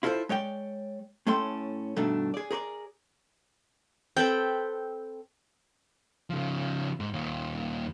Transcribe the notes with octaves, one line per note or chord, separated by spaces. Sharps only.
E4 F4 A4 B4 C5
G#3 C#5 D5 G5
A2 A3 C#4 A4 G5 C6
G2 B2 D#3 A3 D4
G#4 D5
G#4 A#4 C5 D5
C4 A4 B4 G5
C#3 F3
G#2
D#2 A#2